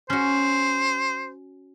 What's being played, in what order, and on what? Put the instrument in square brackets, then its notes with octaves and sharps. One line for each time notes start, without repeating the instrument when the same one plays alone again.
[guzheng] C#4 F#4 [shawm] C5